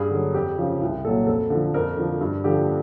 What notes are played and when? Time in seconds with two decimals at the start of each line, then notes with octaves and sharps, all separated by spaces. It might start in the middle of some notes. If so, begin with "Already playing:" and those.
Already playing: G2 G#4
0.11 D3 F#3
0.34 F2 G4
0.58 C#3 F3
0.81 C2
1.04 A#2 A4
1.08 F#3
1.27 F2 A4
1.50 D3 F3
1.74 F2 A#4
1.97 D3 F3
2.21 G2
2.44 D3 F3 G4